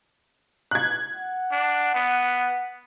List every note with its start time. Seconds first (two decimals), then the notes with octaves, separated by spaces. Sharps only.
0.71 F#6 G#6
1.16 F#5
1.52 D4
1.95 B3